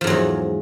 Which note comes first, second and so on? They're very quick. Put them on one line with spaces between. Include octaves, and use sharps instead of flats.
F3 G#2 F#3 E2